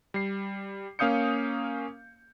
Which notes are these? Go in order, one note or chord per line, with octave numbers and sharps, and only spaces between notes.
G3 C7
A#3 C#4 F5 D#6 G6 C#7